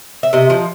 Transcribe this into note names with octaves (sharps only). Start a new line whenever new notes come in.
E5
C3 D#5
F3